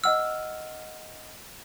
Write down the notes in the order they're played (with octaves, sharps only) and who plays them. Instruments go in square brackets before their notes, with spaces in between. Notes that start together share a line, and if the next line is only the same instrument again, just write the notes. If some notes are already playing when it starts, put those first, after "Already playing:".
[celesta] D#5 F#5 F6 [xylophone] E6